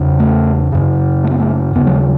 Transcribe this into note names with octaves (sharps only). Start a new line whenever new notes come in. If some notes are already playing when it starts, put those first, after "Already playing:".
Already playing: E2 C#3
A3
F#2 C#3
A3
B3
A3
D#2 C#3 B3
F#3
G#3